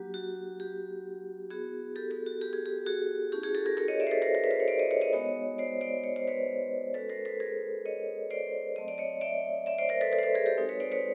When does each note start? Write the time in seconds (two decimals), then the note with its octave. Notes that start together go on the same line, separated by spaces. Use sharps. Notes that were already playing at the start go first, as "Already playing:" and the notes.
Already playing: F#3 A#3 D4 F#4 G4
0.14 F#4
0.60 G4
1.51 B3 E4 F#4 G#4
1.96 G4 A4
2.11 G4 A4
2.26 F#4
2.42 G4
2.53 G#4
2.66 G4
2.86 F#4 G#4
3.32 A3 C#4 E4 G4
3.43 F#4 G#4
3.55 G4 A4
3.66 G#4 A#4
3.77 G#4 A#4
3.88 C#5 D#5
4.00 D5 E5
4.07 C5
4.11 A4 B4
4.22 A#4 C5
4.35 A#4
4.44 B4
4.51 C5
4.60 C#5
4.68 C5 D5
4.79 C#5 D#5
4.91 C#5 D#5
5.01 C#5 D#5
5.13 G#3 B3 D#4 F#4 C#5 D#5
5.58 C5 D5
5.81 C5 D5
6.04 C#5
6.16 C5
6.28 B4 C#5
6.94 G#3 C#4 F#4 A4 B4
7.10 A#4 C5
7.25 A4 B4
7.40 G#4 A#4
7.86 C#5 D#5
8.31 C5 D5
8.76 F#3 A3 C4 D#5
8.88 D5
8.98 C#5 D#5
9.21 D5 E5
9.66 D5 E5
9.78 C5 D5
9.89 A#4 C5
10.01 A4 B4
10.12 A4 B4
10.19 C5
10.23 A4 B4
10.35 G#4 A#4
10.46 G4 A4
10.57 G#3 C4 D#4 F#4
10.69 B4 C#5
10.80 C5 D5
10.92 B4 C#5